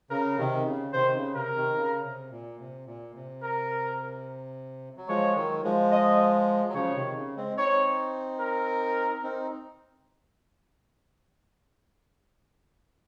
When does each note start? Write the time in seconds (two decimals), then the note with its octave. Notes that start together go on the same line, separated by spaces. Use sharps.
0.10 C#3 A#4
0.38 C3 D#3
0.66 C#3
0.93 C3 D#3 C5
1.15 C#3
1.35 C3 A#4
1.56 C3 D#3
1.76 C#3
2.04 C3
2.31 A#2
2.59 C3
2.87 A#2
3.15 C3
3.42 A#4
4.97 F#3
5.08 F3 G#3 C#5
5.36 D#3 F#3
5.64 F3 G#3
5.92 D#5
6.69 F#3
6.74 C#3 F3 C#5
6.95 C3 D#3
7.16 C#3
7.37 G#3 C4
7.58 C4 D#4 C#5
8.40 A#4
9.23 C4 D#4